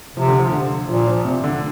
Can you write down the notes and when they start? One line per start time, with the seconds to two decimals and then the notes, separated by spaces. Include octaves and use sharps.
0.17 C3 F3
0.28 D3
0.39 F3
0.53 D3
0.89 A#2 F3
1.07 F3
1.25 C3
1.44 D3